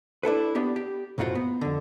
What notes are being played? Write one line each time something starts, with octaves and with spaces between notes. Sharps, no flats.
D4 E4 A4 B4
B3 D4 G4
G4
B1 F#2 A2 F4 F#4 C5
B3
F2 D3